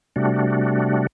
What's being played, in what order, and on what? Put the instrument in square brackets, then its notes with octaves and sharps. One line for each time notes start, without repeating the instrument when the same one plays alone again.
[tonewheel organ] C3 G3 A3 D4 F#4